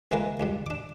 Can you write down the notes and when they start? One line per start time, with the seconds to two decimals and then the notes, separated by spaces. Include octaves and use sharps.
0.11 C#2 E3 G#3 A#3 A#4 B4
0.40 C#2 G2 G3
0.66 D4 D6